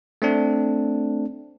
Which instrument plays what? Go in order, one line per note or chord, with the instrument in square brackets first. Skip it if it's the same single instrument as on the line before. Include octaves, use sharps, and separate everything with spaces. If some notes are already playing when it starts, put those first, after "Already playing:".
[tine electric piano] A3 C4 D4